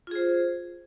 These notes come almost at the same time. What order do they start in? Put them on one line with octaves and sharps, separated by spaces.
F4 G#4 C5